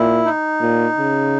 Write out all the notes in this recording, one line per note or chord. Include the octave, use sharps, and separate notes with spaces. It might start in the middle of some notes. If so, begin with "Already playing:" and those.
Already playing: A#2 E4
D#4
A#2
C#3